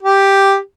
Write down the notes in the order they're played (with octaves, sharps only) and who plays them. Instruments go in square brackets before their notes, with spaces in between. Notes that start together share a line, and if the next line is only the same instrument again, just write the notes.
[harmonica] G4